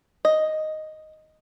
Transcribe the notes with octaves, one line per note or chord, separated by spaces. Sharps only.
D#5